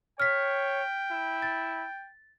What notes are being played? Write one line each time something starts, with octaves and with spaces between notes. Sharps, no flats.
C#5 G5 F6 B6
E4
A6